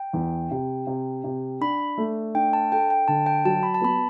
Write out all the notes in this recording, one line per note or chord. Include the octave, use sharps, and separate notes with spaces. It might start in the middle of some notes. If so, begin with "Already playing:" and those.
Already playing: G5
E2
C3
C3
C3
D4 B5
A3
D4 G5
A5
A4 G5
G5
D3 A5
G5
F#3 A5
B5
A5
B3 B5